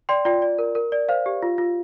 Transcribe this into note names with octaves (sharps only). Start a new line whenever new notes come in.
D5 G5 C6
F4 D5 G5
D5
A#4
A#4
D5
C5 F5
G4
F4
F4